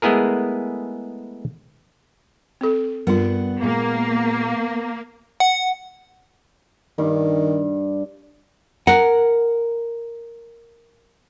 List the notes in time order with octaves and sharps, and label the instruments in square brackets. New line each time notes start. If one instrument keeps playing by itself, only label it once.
[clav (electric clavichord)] G#3 A3 B3 E4 G#4 A#4
[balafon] C4 A4
[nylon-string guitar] G2 G3 D4 [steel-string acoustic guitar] B3 F#5 [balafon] F4 A#4
[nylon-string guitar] A#2 G#3 [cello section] A#3
[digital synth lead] F#5
[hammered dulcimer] G2 [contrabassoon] D#3
[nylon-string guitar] A#4 [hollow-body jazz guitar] F#5